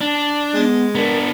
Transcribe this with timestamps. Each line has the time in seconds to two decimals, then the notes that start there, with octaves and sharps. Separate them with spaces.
0.01 D4
0.54 G#3 B3
0.95 B3 D4 A#4